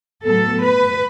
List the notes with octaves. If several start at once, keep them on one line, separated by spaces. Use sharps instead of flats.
A2 F#3 B3 A4
B4